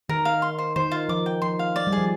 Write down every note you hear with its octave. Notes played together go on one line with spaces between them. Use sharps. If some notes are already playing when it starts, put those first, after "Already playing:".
D#3 A#4
F5
C6
C5
D#3 C5
F4
F3 D6
G5
F3 C6
F5
D5
G3
G#4
F3